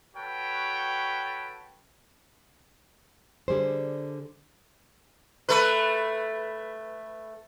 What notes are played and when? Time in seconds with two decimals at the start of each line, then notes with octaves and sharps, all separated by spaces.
0.15 F#4 A4 B4 C#5 G5
3.48 D3 G3 G#4 C5
5.49 A3 B4